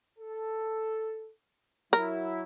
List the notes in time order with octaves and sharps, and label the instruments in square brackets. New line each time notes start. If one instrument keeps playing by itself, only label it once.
[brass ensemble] A4
[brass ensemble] F#3 E4 [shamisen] A#4